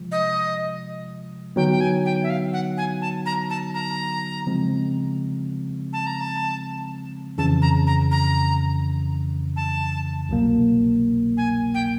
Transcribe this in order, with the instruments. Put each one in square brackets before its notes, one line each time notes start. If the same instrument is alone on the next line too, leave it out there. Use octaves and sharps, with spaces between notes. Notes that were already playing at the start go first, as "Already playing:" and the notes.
Already playing: [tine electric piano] C3 F3 G#3
[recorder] D#5
[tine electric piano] D3 F#3 B3 D#4 [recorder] G5
[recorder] G5
G#5
G5
E5
F5
F#5
G#5
A5
A#5
A5
A#5
[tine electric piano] C#3 F3 G#3 C4
[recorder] A5
A#5
A5
[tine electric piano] F2 C#3 E3 [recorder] A5
[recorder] A#5
A#5
A#5
A5
[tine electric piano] C2 B2 F#3 A#3
[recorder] G#5
G5